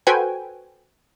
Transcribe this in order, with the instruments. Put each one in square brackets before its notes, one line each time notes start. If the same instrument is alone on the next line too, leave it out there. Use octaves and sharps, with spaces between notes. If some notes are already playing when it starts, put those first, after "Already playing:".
[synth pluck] F#4 A4 B4 C5 G5 G#5